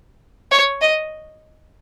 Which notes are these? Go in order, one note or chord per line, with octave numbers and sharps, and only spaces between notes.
C#5
D#5